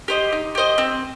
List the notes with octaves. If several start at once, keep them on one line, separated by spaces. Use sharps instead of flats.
G4 C5 D#5
D#4
G4 C5 D#5
C4